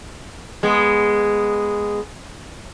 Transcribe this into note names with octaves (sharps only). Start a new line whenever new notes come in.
G#3 B3